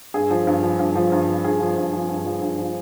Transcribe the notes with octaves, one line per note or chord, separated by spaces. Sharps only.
G2 G#4
F3
G2
F3
G2
F3
G2
F3
G2 G#4
F3
G2
F3
G2
F3
G2
F3